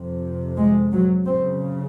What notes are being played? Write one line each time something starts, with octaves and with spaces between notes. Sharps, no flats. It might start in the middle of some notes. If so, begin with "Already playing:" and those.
Already playing: F2 C3
G#3
F#3
F#2 C#3 C4